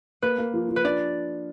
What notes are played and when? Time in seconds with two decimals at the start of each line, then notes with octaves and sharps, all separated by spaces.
0.22 A#3 B4
0.38 A#3
0.54 F3
0.69 F3
0.76 B4
0.85 D4 D5